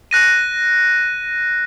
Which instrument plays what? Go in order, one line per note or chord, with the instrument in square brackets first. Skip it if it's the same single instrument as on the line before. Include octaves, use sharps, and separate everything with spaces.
[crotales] F#6 A#6 D#7